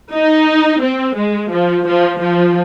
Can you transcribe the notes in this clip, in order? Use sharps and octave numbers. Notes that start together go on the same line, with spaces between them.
D#4
C4
G#3
F3
F3
F3